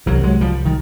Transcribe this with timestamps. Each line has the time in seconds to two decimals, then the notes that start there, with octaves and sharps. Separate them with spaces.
0.06 C2 B2 E3 F#3
0.23 F#3 G#3
0.41 F3 G3
0.65 D#3